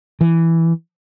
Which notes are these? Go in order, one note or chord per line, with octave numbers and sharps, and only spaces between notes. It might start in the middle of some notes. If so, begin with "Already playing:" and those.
E3